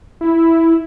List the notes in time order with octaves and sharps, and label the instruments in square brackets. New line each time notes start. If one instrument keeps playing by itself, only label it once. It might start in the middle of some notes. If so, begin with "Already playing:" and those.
[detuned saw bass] E4